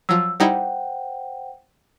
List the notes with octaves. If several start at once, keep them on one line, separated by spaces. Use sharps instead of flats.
F3 F#3 E6
G3 D#4 E4 C5 F#5 G5